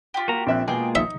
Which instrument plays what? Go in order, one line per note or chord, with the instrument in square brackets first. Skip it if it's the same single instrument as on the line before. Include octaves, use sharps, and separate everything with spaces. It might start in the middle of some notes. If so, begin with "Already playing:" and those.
[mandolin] F4 G4
[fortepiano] A#3 [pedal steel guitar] F#4 A#5
[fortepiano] A#1 E5 F#6 [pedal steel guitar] C4
[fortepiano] B2 [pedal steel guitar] G#3 A#3 F4 [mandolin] G#4 G5 D6
[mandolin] D#4 [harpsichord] E5